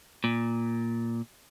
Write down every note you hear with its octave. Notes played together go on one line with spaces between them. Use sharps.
A#2